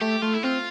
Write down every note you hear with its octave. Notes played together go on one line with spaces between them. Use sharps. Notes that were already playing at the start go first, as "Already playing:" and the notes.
A3 G4
A3 F4
E4
C4 F4